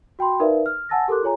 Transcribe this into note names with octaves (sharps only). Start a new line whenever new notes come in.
F#4 G5 B5 C6
D#4 A#4 B4 D5 E5 F5
F6
F#5 G#5 A5 E6 A6 A#6
G4 A4 A#4 C6 D6 F#6
F4 G#4 C#5 G#5 A#5